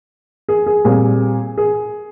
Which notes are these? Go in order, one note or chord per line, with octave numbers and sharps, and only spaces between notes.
G#4
G#4
A#2 G3 C4 G#4
G#4